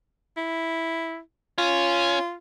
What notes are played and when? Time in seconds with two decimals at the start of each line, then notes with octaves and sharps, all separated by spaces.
0.37 E4
1.58 C#4 F4